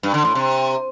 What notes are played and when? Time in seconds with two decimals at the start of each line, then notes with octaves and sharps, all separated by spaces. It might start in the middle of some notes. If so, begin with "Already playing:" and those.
0.03 G2
0.14 D3
0.25 A2
0.35 C3